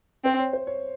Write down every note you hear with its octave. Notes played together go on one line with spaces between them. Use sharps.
C4 C5
C#5
C5
C#5